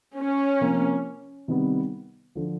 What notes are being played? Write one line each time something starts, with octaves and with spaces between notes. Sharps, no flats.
C#4
C3 F3 A#3
C3 D#3 G3 B3
D3 F3